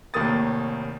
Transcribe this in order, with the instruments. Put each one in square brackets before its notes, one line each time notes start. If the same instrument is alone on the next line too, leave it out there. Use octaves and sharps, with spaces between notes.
[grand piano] F1 D#2 A2 A#3 D#6 A6